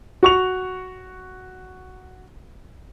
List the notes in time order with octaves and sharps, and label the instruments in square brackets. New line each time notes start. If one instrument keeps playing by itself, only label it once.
[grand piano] F#4 C#6 F7